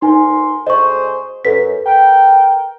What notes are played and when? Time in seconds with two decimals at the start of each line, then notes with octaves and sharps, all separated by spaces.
0.02 D2 D#4 A#4 G#5 C6
0.67 D2 G#4 C5 D#5 C#6
1.45 F#2 A4 B4 B6
1.86 A#4 G5